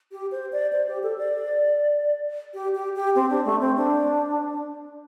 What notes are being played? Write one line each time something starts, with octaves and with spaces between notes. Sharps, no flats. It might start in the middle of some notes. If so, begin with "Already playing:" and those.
G4
C5
D5
C5
G4
A4
D5
G4
G4
G4
C4
D4
A3
C4
D4